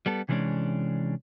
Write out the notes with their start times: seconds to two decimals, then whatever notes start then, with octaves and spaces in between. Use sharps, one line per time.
0.06 G3 B3 A4
0.29 C3 E3 G3 G#3 C#4 D4